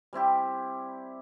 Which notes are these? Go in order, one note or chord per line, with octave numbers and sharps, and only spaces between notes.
G3 C4 E4 G4